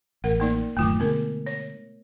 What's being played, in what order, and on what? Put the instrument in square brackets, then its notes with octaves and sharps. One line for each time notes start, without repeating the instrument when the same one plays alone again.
[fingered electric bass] A1 [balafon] A#4 F#5
[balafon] A#3 D#4 D5
[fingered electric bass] D1 F#2 D#3 [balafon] A3 F4 D6
[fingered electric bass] B2 D3 G#3 [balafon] B3 A#4
[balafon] C#5